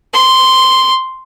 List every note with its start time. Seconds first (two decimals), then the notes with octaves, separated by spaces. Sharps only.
0.14 C6